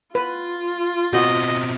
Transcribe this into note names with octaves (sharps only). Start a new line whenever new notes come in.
F4 B4
B2 C4 F#4 D#5